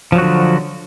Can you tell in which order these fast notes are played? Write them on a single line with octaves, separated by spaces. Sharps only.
F3 F#3 F#4 D3